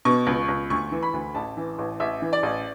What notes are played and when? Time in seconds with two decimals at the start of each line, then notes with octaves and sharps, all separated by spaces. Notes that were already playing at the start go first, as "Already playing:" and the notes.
0.05 B2 C#6
0.27 C#2
0.48 C#2
0.70 D2 C#6
0.92 E3
1.03 B5
1.13 D2
1.35 A1 A5
1.57 E3
1.78 A1
2.00 A1 E5
2.22 E3
2.33 D5
2.43 A1